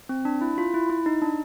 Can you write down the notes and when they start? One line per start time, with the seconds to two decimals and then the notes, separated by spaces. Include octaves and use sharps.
0.09 C4
0.25 D4
0.41 E4
0.58 F4
0.74 E4
0.90 E4
1.06 D#4
1.22 D4